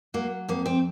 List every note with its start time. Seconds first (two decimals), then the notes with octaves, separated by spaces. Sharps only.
0.14 F#3 A#3
0.49 F2 A#3
0.66 C4